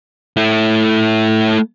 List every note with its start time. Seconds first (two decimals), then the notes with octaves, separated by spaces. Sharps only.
0.37 A3 E4